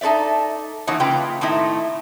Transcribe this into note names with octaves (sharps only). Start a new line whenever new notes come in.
D#4 A4 C5 D5 E5
E3 F3 A#3 D#4 F#4 C#5
C#3 A#3 F4 B4 G5
A2 D#3 A3 C4 D#4 E4